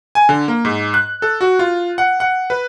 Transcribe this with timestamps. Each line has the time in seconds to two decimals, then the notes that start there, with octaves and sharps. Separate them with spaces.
0.15 G#5
0.29 D3
0.48 A#3
0.65 G#2
0.94 F#6
1.22 A4
1.41 F#4
1.59 F4
1.98 F#5
2.20 F#5
2.50 B4